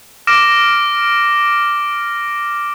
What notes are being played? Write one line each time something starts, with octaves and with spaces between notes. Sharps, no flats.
D6 F6 A#6 D7 E7